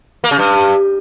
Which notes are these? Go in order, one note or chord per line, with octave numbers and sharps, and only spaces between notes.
A#3
C#3
G2